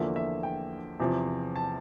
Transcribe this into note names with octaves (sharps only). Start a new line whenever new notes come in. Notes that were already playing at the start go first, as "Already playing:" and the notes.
Already playing: E2 D3 F3 A#3 E5
E5
G5
E2 C3 F3
A5